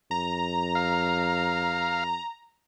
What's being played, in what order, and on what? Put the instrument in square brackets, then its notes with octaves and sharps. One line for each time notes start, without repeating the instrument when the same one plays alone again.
[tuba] F2 [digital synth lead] A#5
[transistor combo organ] F5